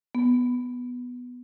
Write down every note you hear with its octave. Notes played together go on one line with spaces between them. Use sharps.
B3